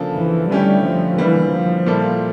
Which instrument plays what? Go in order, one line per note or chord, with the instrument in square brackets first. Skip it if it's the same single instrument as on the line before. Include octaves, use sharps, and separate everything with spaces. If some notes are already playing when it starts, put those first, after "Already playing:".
Already playing: [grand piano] C#3 F3 A#3 D4 A4
[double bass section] E3
[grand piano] D3 A3 C#4 E4 G4 [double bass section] G3
[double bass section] F3
[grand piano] D3 G3 A#3 [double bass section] E3
[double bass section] F3
[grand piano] A#2 G3 A#3 E4 A4